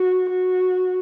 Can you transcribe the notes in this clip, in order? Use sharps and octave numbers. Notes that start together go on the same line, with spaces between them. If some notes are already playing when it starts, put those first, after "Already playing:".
Already playing: F#4
F#4